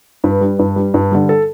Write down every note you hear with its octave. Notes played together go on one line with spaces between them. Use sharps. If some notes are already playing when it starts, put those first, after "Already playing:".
G2 B4
G3
G2
G3
G2
D3 G3
A4